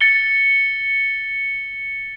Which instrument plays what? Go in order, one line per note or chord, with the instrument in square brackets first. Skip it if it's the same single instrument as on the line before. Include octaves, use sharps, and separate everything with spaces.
[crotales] A6 C#7 G7